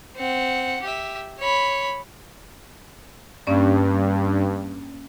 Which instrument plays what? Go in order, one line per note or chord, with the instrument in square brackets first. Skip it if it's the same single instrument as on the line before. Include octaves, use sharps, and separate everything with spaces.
[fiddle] C4 F#5
G4 E5
C#5 B5
[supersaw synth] G2 [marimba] A#3 C#4 D5